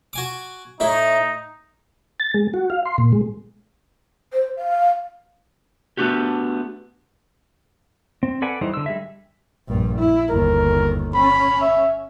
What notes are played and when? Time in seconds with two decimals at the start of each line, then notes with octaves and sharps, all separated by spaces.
0.13 F#4 G#5 D6
0.80 A2 D#4 E4 C#5 E5
2.20 A6
2.34 G#3
2.54 F#4
2.70 F5
2.86 C6
2.98 A#2
3.12 G#3
4.33 C5
4.57 F5
5.97 A3 B3 D4 F#4 G4
8.23 C4
8.42 A4 B4 D5 F#5 G#5
8.61 E3 G3 D#4 C5
8.74 D3 E6
8.86 G3 G#3 E5
9.68 A#1 G2
9.99 E4
10.30 G1 D#2 A#4
11.14 C#4 B5
11.61 E5